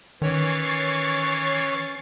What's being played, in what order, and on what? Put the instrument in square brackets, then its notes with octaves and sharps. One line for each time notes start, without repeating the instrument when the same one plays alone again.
[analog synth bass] D#3 [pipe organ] E3 C#5 [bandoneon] C#4 [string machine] C#6 A6 C7